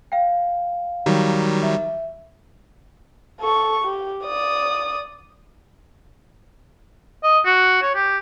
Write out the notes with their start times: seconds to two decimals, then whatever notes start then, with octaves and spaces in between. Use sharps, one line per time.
0.12 F5 G5
1.06 D#3 F#3 G3
1.63 E5
3.40 A4 C#6
3.84 G4
4.25 D5 D#6
7.23 D#5
7.45 F#4
7.82 C#5
7.95 G4